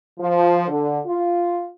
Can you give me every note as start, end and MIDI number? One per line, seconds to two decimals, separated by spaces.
0.19 0.67 53
0.68 0.97 50
1.05 1.67 65